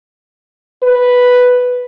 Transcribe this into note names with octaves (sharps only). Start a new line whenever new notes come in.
B4